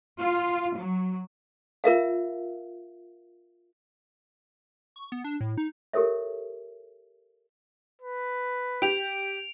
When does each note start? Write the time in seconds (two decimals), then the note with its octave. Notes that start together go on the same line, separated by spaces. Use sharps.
0.19 F4
0.77 F#3
1.84 F4 A#4 E5 F5
4.96 C#6
5.12 B3
5.24 D4
5.41 A2
5.58 D#4
5.93 G4 A4 A#4 C#5 E5
8.02 B4
8.82 G4 D7 F7